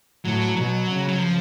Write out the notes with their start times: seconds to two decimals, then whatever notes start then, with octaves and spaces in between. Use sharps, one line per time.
0.25 A2 F#3
0.57 B2 F#3
0.88 C#3
1.08 F#3
1.19 F3